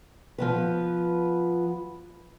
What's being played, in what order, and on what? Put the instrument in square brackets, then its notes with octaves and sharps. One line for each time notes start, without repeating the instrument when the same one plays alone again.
[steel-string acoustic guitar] F3 B3 B4